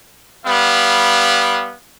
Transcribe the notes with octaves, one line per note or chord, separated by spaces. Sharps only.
G3 B3 F5